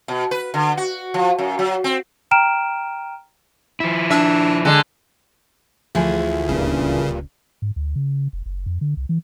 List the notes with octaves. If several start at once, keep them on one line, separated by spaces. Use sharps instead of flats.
B2
B4
D3
F#4
F3
F#2
F#3
C4
G5 A#5 F6 D7 E7
F3 E4
D4 E5
D3 G#3
D2 E3 F3 G#4
D1 C#2 G2 A#2 C#3 C#4
G#2
D2
C#3
F1
F#1
F2
D3
C2
E3